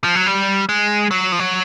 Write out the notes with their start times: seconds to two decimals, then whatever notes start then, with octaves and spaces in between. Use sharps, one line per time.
0.04 F3
0.15 F#3
0.26 G3
0.69 G#3
1.11 F#3
1.32 F3
1.39 F#3